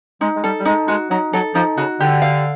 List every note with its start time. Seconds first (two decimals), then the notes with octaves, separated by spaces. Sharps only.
0.21 G#3 D#4
0.36 G#3
0.43 G3 A4
0.59 G3
0.65 G#3 D#4
0.88 G#3 F#4
1.11 F#3 D#4
1.33 F#3 A4
1.55 F3 D#4
1.77 C#3 F#4
2.00 D3 G4
2.22 F5